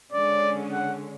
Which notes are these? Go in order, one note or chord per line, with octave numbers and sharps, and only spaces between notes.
D3 G#3 C#4 D5
F#5